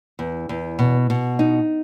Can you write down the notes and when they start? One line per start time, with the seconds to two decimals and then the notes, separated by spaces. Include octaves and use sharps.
0.19 E2
0.49 E2
0.79 B2
1.10 B2
1.39 D#4